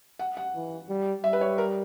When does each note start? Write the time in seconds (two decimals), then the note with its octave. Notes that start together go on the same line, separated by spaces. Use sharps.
0.19 F#5
0.37 F#5
0.55 E3
0.89 G3
1.24 G3 E5
1.33 B4
1.41 C#5
1.58 A#4